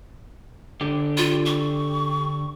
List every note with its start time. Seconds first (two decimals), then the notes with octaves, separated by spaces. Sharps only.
0.81 D3 G4
1.17 F4
1.46 C#6